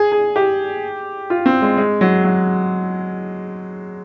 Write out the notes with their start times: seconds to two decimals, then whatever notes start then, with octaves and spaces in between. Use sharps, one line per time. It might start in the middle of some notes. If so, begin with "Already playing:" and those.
Already playing: G#4
0.12 G#4
0.36 G4
1.30 F4
1.46 C4
1.62 G#3
1.77 G#3
2.01 F#3
2.24 F#3